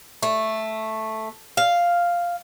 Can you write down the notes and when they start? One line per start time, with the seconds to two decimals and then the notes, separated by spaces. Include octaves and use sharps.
0.23 A3
1.57 F5